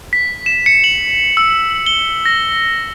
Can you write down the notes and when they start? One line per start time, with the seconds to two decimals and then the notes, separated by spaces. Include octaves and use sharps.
0.13 B6
0.46 E7
0.66 C#7
0.84 F#7
1.37 E6
1.86 G7
2.26 A#6